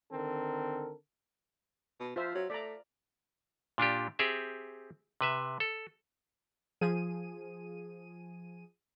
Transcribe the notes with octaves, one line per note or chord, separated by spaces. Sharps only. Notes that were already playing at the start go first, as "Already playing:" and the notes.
D3 D#3 C4 A4 A#4
B2
F3 F4 C5 E5
F#3
A3 D5 A#5
A#2 D4 F4 G4
C4 G4 G#4 E5
C3 B4 E5
A4
F3 G#4 D#7